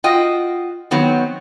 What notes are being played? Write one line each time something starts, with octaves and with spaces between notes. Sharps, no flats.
F4 F#4 D#5 G5
D#3 F#3 B3 C4